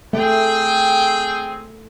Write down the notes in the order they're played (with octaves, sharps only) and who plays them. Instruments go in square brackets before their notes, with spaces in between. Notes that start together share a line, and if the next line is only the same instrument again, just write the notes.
[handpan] A3 [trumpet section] C4 G#4 G5